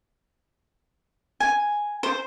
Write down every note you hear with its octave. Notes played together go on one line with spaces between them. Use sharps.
G#5
C5